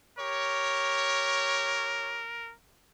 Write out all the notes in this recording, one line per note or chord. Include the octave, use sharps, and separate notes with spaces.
G4 A#4 C#5